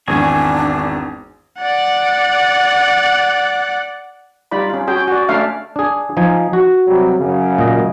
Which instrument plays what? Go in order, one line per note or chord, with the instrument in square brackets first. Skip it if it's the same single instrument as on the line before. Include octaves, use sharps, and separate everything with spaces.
[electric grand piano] G#1 E2 [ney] D4 [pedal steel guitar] G#4 G#5 C#6
[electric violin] D5 F#5
[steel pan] G3 D#4 F4 D5 B5
C#4 F4
C#4 F#4 G#4 G5
F#4 D5
A3 C#4 D4 D5 E5 F5
[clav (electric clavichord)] D4 G#4
F3 D#4 G#5
F#4
[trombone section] C3 F#3 G3
F#2 C#3
[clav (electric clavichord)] A#2 D#5